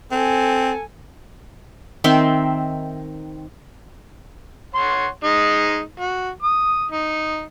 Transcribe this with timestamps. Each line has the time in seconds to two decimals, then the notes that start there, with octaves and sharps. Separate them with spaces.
0.11 C4 A4 G#5
2.04 D#3 C4 E5 C6
4.75 C#5 F#5 C6
5.24 G#3 D#4
6.00 F#4
6.43 D#6
6.91 D#4